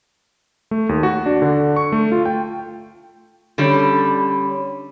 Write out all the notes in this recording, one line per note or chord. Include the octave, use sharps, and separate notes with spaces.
A3
D#2
F#4
D4
D3
C#6
A3
F4
G5
D3 G3 C#4 C#5 B5